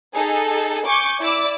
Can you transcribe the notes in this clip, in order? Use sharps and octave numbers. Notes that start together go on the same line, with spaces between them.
D#4 G#4 A4
G#5 C#6 D6 G6
E4 D5 D6 E6